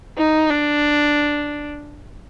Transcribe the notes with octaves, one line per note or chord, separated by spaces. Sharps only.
D#4
D4